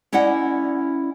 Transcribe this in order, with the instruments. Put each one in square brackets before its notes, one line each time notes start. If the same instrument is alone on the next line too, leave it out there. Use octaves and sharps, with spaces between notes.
[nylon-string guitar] C#4 E4 D5 D#5 F#5